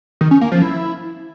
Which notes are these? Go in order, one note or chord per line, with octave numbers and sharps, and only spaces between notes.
D#3
C#4
A#3
F3
E4